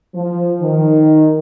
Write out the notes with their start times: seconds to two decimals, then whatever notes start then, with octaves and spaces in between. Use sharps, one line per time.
0.15 F3
0.62 D#3